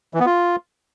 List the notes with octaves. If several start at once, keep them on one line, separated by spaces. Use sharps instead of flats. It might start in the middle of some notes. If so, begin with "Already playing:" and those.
E3
B3
F4